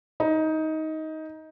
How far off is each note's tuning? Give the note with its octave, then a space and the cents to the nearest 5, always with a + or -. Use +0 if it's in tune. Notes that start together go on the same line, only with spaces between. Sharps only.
D#4 +15